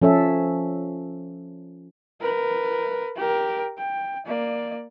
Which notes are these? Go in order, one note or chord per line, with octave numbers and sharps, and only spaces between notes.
F3 C#4 A4 E5
A#4 B4
G4 A#4
G5
A#3 D5